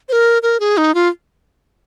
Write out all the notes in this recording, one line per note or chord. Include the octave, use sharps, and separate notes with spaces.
C5
A#4
A#4
G#4
D#4
F4